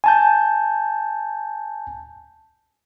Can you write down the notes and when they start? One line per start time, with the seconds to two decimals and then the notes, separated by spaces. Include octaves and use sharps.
0.04 G#5 A5 G6